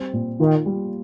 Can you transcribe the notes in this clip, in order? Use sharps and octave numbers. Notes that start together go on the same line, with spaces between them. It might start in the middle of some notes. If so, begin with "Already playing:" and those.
Already playing: G3 C4
A#2
D#3 F4
G3